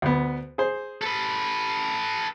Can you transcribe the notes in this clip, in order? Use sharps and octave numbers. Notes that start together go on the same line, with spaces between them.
D2 B3
G#4 C5
A4 B4